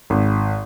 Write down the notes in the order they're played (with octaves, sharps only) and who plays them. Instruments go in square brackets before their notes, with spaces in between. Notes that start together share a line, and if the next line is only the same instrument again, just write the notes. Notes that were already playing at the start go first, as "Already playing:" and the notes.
[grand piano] G#1